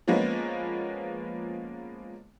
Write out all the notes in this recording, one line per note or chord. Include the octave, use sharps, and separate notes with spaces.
F3 G#3 A#3 B3 C#4